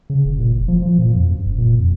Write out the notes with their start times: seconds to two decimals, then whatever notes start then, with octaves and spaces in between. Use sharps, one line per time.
0.10 C#3
0.25 E1
0.39 A#2
0.55 F1
0.68 F3
0.82 F3
0.99 A#2
1.15 F2
1.29 F#2
1.46 E1
1.58 A#2
1.79 F2